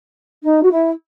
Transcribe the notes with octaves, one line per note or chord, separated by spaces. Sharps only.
D#4
F#4
E4